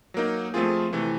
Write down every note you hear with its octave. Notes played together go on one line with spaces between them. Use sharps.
F#3 A#3 D#4
F3 A3 C4 F4 G#4
C3 E3 A3